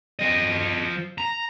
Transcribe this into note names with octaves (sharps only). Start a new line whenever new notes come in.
F3 D#5
A#5